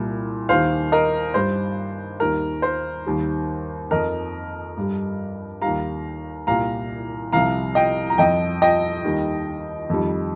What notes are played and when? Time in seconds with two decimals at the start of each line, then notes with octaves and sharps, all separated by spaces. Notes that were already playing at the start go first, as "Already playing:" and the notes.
Already playing: C2 A#2 G3
0.49 D#2 D#3 G3 C5 F5
0.92 A#4 D#5
1.34 G2 G3 C5
2.20 D#2 D#3 G3 A#4
2.62 C5
3.06 D#2 D#3 G3
3.91 F2 F3 A#4 D#5
4.77 G2 G3
5.62 D#2 D#3 G3 F5 A#5
6.47 C2 A#2 G3 F5 A#5
7.32 C2 C3 F3 F5 A#5
7.75 D#5 G5
8.10 A#5
8.18 F2 F3 D#5 G5
8.62 D#5 G5
9.04 D#2 D#3 G3
9.90 F2 D#3 G3